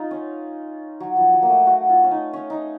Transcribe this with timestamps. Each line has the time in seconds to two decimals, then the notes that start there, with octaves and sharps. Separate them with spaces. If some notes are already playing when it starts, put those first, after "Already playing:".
Already playing: D#4 F4
0.11 C#4
1.00 F#3
1.16 F3
1.34 F#3
1.42 A#3
1.49 A3
1.67 F#4
1.89 F4
2.04 C#4
2.11 D#4
2.33 C#4
2.50 D#4